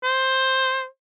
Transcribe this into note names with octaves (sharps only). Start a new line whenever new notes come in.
C5